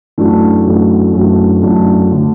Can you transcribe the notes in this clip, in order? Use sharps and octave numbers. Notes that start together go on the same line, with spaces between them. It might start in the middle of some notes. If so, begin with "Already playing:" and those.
F#2 E3 A3 D4 F#4
F#2 E3 A3 D4 F#4
F#2 E3 A3 D4 F#4
F#2 E3 A3 D4 F#4
D3 A3